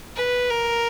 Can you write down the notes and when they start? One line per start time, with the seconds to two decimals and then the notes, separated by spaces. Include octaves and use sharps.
0.16 B4
0.50 A#4